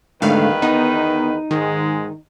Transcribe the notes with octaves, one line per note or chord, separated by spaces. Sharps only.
E2 G#2 D3 D#3 A3 B4 F5
B3 D#4
G#2 D#3 G#3